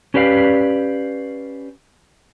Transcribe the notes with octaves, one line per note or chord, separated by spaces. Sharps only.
C#4 G4 B4 D5 F5